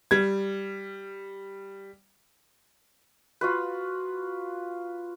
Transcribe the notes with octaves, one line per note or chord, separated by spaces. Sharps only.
G3 G#6
F4 F#4 B4